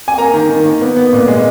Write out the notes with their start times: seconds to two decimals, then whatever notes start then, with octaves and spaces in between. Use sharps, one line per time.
0.08 G#5
0.18 A#3 A#5
0.34 D#3
0.50 D#3
0.65 A#3
0.81 B3
0.96 B3
1.13 A#2
1.28 G#3